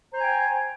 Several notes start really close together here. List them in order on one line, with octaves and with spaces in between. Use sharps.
C5 A#5 G#5 G5